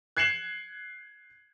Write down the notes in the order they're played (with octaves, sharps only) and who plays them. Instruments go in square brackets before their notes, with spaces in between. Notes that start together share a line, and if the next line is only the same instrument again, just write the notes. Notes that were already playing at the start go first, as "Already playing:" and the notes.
[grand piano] F#6 G#6 C7 C#7 E7 F#7